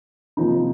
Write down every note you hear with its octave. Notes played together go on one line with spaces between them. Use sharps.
C3 F3 A#3 D#4